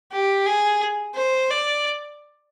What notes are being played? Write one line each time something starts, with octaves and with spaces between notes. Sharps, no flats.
G4
G#4
C5
D5